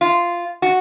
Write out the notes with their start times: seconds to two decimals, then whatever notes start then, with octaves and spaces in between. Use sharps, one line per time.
0.01 F4
0.62 F#4